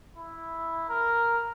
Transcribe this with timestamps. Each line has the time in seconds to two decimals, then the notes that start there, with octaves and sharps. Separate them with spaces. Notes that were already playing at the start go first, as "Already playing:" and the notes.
0.17 E4
0.90 A#4